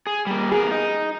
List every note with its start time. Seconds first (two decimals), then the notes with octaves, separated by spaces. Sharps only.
0.07 G#4
0.26 G3 A#3
0.52 B3 G#4 A#4
0.71 D#4